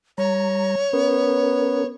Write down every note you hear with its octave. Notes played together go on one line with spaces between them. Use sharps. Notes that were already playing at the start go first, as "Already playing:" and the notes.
G3 C#5 A#5
B3 C#4 A#4